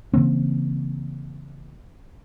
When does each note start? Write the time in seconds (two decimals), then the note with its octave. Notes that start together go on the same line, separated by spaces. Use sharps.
0.13 C#3 E3 A#3 C4